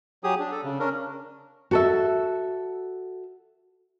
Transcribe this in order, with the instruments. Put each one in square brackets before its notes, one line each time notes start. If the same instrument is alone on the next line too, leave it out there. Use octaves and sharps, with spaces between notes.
[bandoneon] F#3 G4 G#4 D#6
D4
A4
C#3
C#4 D4 A#4
[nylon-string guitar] F#4 A4 E5